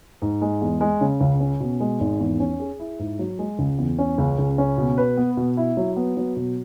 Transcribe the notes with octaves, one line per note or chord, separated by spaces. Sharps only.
G#2
G#3
E2
G#3
C#3
C#2
C#4
B2
G#3
G#1
E2
C#4
G#4
E4
G#2
F#3
G#3
C#2
E2
C#4
C#2
C#2
C#4
B2
B4
B3
B2
E4
F#3
B3
F#3
B2